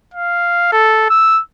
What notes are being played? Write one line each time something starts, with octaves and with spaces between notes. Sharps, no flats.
F5
A4
E6